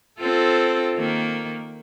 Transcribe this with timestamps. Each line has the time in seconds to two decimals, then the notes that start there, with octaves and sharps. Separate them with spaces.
0.19 C4 F4 A4
0.95 D#3 A#3